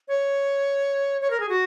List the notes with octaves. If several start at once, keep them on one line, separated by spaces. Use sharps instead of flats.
C#5
C#5
A#4
G#4
F#4